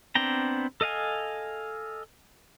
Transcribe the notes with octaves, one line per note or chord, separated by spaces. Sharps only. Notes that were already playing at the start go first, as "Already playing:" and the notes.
B3 C4 D4 G5 A#5
A4 D#5 F5 G#5